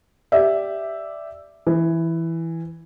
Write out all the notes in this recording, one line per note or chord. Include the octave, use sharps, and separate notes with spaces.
G4 D5 E5
E3